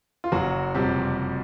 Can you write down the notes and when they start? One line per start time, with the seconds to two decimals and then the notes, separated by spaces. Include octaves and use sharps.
0.24 F4
0.32 F#1 F#3 F#4
0.75 F2 C3 G3 G4